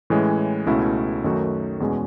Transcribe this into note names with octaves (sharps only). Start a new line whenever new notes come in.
A2 E3 G#3 C#4
C#2 B2 A3 C#4 E4
F#2 D#3 A3 D#4 F#4
E2 B2 G#3 C#4